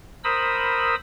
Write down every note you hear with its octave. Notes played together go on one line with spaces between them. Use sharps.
A#4 C5 B5 D#6 E6